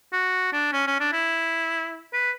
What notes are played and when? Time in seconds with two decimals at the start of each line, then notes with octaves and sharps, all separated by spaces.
0.13 F#4
0.53 D4
0.73 C#4
0.87 C#4
1.00 D4
1.12 E4
2.13 B4